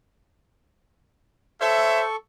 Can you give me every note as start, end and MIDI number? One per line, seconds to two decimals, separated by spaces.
1.61 2.16 69
1.61 2.01 72
1.61 2.01 73
1.61 2.01 76
1.61 2.16 85